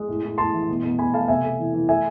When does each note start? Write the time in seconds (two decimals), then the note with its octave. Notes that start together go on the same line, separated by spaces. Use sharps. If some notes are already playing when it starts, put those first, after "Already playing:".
Already playing: G#3
0.08 A2
0.23 A2
0.38 A2 A5 C6
0.53 E3
0.68 B2
0.83 B2
0.99 B2 G#5 B5
1.14 A3 F5 A5
1.28 C3 E5 G#5
1.44 A3
1.59 E3
1.74 E3
1.89 A3 E5 G#5